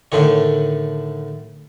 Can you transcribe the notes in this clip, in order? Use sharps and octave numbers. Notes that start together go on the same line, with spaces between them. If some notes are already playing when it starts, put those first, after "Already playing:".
A2 D3 D#3 C#5